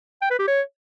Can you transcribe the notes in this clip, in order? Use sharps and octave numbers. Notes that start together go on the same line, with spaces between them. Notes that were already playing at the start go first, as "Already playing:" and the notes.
G5
B4
G4
C#5